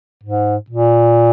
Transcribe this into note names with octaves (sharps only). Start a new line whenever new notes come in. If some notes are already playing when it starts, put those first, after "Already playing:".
G#2
A#2